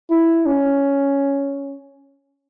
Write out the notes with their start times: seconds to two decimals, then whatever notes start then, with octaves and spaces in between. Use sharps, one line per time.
0.10 E4
0.46 C#4